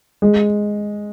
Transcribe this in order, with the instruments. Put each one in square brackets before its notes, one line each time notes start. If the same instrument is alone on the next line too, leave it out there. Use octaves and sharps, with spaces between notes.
[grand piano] G#3